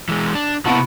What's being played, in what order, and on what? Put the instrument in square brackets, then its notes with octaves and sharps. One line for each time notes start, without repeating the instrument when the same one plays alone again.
[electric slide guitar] E3 G#3
D4
[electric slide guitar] C3 A#3 A5 [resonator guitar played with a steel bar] B3 E4 F#4